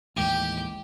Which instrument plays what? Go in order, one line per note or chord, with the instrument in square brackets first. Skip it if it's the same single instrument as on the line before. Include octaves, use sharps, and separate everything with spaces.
[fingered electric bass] A1 D#2 G#3 [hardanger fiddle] G4